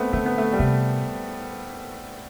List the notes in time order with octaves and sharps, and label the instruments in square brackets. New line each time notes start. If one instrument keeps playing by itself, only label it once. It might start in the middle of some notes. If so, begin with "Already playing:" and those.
Already playing: [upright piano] A3 B3 C4
[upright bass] D3 [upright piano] A3
[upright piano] B3
A3
G3
[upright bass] C3 [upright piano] A3